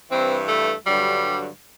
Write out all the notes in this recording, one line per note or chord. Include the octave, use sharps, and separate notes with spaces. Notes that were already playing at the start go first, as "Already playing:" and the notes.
G2 E3 C4
A3
G2 D3 F#3 G3